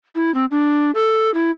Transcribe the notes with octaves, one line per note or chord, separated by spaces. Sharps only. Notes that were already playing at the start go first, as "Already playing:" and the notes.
E4
C4
D4
A4
E4